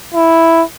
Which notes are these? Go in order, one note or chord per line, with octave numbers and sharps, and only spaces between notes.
E4